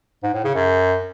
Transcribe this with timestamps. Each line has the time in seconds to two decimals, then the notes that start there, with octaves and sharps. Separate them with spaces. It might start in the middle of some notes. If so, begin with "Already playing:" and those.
0.23 G#2
0.34 A2
0.44 C#3
0.55 F#2